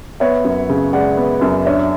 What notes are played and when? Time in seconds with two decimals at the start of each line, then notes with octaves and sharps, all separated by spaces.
0.20 B3 C#5 E5
0.44 F#2
0.69 C#3
0.93 G#3 D5 F#5
1.17 B3
1.41 F#2
1.65 D4 C#5 E5